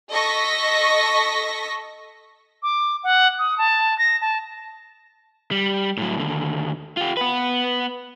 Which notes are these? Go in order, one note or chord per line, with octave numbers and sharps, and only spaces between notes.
A4 D#5 C#6 A#6 B6
D6
F#5
D#6
A5
A#6
A5
G3
A2 F#3
D#2 D3
F4 G4
B3 B4